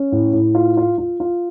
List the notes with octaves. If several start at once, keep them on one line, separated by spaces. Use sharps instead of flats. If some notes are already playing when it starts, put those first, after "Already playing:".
Already playing: C#4
A2
A2
F4
F4
F4
F4